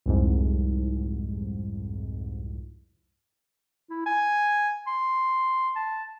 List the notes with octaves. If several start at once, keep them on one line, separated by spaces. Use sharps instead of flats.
C2 F2 G#2
E4
G#5
C6
A5